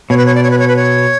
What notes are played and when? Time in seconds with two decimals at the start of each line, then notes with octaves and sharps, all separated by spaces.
0.10 B2 C#5
0.17 B4
0.26 C#5
0.35 D5
0.43 C#5
0.51 B4
0.59 C#5
0.68 B4
0.76 C#5